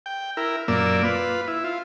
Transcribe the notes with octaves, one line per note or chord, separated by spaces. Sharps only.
G5
E4 A#4
F#2 A#2 A#3 D5 E6
F4 B4
E4
F4